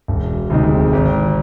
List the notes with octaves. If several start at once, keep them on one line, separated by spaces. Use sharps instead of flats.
E1
D2 C3 D#3 G#3
G#1